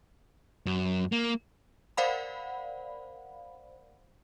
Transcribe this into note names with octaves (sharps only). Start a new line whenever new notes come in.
F#2
A#3
A#4 C5 D5 F5 F#5 B5